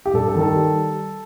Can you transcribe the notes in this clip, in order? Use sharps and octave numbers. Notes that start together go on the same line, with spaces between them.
G4
G2 A4
A4
D#3
A4
G3